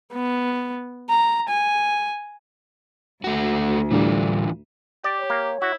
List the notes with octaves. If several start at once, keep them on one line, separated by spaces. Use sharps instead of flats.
B3
A#5
G#5
D2 A3 F#4
A2 D3 E3 G3 D4 F4
G4 D5
C#5
A#3
E4 F#4